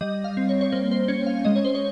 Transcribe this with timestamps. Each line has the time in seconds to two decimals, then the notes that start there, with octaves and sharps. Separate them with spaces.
0.01 G3 D#5
0.24 F5
0.37 C4
0.49 C#5
0.61 C#5
0.72 A#3 C5
0.91 C5
1.08 C#4 C#5
1.27 F5
1.45 G#3 D#5
1.56 C#5
1.65 C5
1.75 C#5